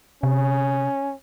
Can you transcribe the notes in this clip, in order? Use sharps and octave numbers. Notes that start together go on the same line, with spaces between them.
C3 C#4